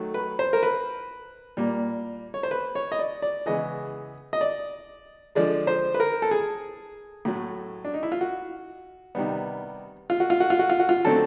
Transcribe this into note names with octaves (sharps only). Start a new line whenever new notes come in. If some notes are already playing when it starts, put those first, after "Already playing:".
Already playing: D#3 F#3 A3
B4
C5
A#4
B4
A#2 G3 A#3
C#5
C5
B4
C#5
D#5
D5
D5
C#3 E3 G#3 B3 D#5
D#5
D5
D3 F3 G#3 D5
C5
B4
A#4
A4
G#4
A2 F#3 A3
D4
D#4
E4
F4
F#4
C3 D#3 G3 B3
F4
F#4
F4
F#4
F4
F#4
F4
F#4
F4
D3 F#3 A3 C4 A4